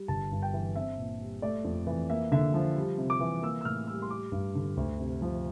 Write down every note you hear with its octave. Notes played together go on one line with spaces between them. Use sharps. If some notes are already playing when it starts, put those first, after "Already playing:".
Already playing: G3
G1 A5
G2
G5
E3
C4 E5
A#2
G3
A3 D5
F2
E3
A#3 E5
D3 E5
F3
G3
C3
D6
E3
A#3 E6
E6
A2 F6
G3 E6
C6
G3 D6
G2
D3
D2
C3
F3